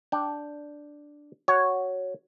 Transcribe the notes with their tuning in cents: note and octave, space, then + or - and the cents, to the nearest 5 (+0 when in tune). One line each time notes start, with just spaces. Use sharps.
D4 +0 G5 +0
F#4 +0 C#5 +0